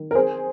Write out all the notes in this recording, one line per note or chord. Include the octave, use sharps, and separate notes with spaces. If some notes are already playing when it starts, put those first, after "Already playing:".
Already playing: D#3
A#4
C4 G#4 C5